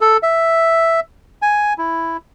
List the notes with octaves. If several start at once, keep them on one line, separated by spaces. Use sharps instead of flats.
A4
E5
G#5
E4